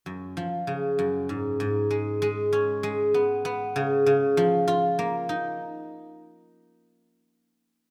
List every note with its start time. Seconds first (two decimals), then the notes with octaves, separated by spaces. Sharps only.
0.06 F#2
0.37 F3
0.67 C#3
0.99 F#2
1.29 G#2
1.60 G#2
1.91 G#3
2.22 G#3
2.53 C#4
2.83 G#3
3.14 B3
3.45 B3
3.76 C#3
4.06 C#3
4.37 F3
4.68 F4
4.99 A#3
5.29 D#4